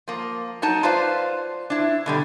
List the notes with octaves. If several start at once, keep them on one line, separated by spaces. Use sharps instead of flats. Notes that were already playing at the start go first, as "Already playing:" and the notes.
F3 A#3
F#3 D#4 A5
F4 B4 C5 D5 F5
D4 E4
B2 D3 G3